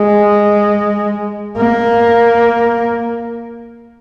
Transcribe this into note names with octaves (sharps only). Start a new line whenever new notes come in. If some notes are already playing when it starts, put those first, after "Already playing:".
Already playing: G#3
A#3